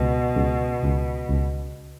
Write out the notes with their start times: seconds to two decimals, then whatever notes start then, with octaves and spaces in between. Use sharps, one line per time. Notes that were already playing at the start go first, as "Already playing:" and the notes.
Already playing: C#2 B2
0.36 C#2
0.83 C#2
1.29 C#2